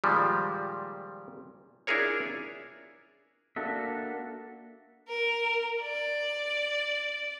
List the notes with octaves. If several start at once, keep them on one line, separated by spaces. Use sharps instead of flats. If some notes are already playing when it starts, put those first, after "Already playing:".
A#2 D#3 F3 G3 G#3
D4 E4 F4 G#4 A#4 C#5
A#3 D4 F#4 A4 E5
A#4
D5